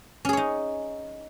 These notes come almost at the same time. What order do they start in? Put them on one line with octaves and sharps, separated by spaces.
C#4 G#4 C#5 D#4